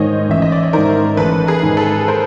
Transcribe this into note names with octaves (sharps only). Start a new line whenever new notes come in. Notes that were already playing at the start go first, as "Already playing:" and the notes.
Already playing: G#2 D#3 C5 C#5 D#5
A1 E5
D#5
D5
C#5
G#2 D#3 A#4 C5
A1 A4 B4
G#4 A#4
G#2 D#3
A4 B4
A#4 C5